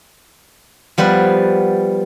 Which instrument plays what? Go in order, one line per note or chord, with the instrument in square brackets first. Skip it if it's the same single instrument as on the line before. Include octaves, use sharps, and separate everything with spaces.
[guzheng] F3 G3 B3 B4 F#5